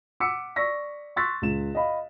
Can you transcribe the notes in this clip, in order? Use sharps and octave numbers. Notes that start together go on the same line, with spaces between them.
F#5 D6 E6 B6 C#7
D5 C#6 E6 A#6 B6
C6 C#6 E6 F#6 A6 B6
C#2 E7
D#5 F5 B5